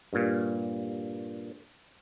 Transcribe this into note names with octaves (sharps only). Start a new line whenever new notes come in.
G2 A#2